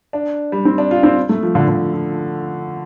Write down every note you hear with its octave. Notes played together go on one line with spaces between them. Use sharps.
D4
G3
C4
D4
F4
C4
A3
F3
D3
D3
F3